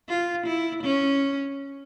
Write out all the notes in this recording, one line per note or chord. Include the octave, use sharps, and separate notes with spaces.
F4
E4
C#4